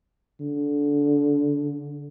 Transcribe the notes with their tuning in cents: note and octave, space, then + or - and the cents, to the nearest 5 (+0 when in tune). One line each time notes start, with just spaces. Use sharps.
D3 -20